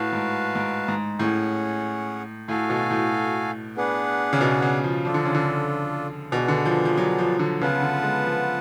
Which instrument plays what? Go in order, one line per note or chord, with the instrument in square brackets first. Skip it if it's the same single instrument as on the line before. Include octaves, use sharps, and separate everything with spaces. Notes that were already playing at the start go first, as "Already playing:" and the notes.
Already playing: [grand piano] A2 [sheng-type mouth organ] F#4 B4 F5 A5
[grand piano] G#2
G#2
G#2
[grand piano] A2 [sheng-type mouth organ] C#4 G#4 C#5 F#5
[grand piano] A2 [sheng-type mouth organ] F#4 A4 F5 G#5
[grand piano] B2
A2
[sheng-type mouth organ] B3 D4 G#4 B4 F#5
[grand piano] C#3
B2
C#3
F3
[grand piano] F3 [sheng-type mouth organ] D4 F4 A4
[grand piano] D3
C#3
D3
[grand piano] B2 [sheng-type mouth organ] B3 D4 G#4
[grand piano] D3
F3
F3
F#3
F3
D3
[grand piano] C#3 [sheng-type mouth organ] B3 F4 B4 F#5 A5
[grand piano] D3
G#3
F3